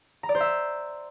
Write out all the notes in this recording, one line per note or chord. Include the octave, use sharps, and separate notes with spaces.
A#5
D5
C5
E5